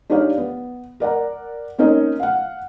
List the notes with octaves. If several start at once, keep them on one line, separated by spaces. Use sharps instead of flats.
D4 D#4 G4 C#5 D5 F5
B3
A#4 D5 F#5 A#5
A#3 C4 C#4 D#4 D#5
F5 F#5